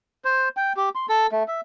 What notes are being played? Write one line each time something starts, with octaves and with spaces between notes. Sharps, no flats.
C5
G5
G4
C6
A4
A3
E5